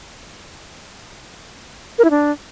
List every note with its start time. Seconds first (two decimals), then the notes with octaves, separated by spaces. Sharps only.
1.98 A#4
2.04 E4
2.10 D4